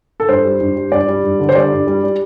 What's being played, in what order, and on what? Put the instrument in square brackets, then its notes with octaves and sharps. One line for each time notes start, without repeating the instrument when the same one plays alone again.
[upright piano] A4
G2 C5
G3
G2
G3
G2 D5
G3
G2
D3
C5
G3 D5
G2
G3
G3